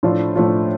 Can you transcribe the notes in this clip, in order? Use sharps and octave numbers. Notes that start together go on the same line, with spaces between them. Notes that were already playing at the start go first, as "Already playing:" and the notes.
A2 F3 A3 D4 F4
A2 F3 A3 D4 F4